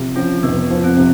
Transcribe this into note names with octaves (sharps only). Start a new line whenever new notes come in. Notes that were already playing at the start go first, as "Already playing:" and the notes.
Already playing: C3 F3
F3 C#4
F1 B3
F3
C4
C3